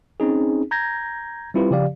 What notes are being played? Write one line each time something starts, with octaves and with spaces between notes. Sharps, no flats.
C4 C#4 D#4 G#4
A#5 G6 G#6 A#6
G3 C4 E4 F4 G4 B4
C#3 F3 G4 D5 F5